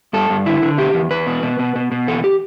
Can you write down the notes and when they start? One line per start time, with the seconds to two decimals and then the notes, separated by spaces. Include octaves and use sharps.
0.13 G2 A4
0.30 G2
0.46 D3 E4
0.62 D3
0.78 B2 G4
0.94 E2
1.11 E2 B4
1.27 B2
1.43 B2
1.59 B2
1.76 B2
1.92 B2
2.08 E2 A4
2.24 G4